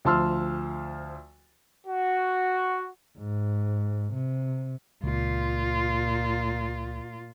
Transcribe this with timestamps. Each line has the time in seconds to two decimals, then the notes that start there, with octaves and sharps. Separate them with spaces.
0.05 D2 F3 A5 C6 E6 F6
1.86 F#4
3.18 G#2
4.14 C3
5.04 C#2 A#2 F4